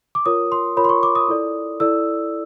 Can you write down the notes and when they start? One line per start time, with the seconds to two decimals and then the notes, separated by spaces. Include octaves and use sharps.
0.15 D6
0.26 F4 A#4 C#5 D#6
0.52 C6
0.76 F4 A#4 C#5 B5
0.84 C6
0.89 C#6
1.03 D6
1.15 D#6
1.28 E4 A4 D5
1.80 E4 A4 D5 E6